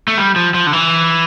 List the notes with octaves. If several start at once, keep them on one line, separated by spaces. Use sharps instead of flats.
A3
G3
F3
F3
D3
E3